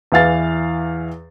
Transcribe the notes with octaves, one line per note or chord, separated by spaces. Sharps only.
E2 E3 F5 A6